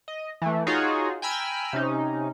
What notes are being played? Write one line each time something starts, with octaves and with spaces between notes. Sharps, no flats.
D#5
E3 A3
D#4 F4 F#4 G#4 C#5
G5 G#5 A#5 B5 E6 F6
C3 C#4 D#4